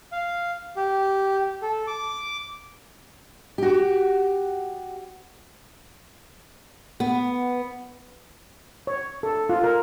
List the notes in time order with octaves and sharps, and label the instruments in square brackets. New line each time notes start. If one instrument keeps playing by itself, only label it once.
[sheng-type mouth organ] F5
G4
A4
D6
[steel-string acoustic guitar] F#4 G4
B3
[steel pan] C#5
A4
F4
A#4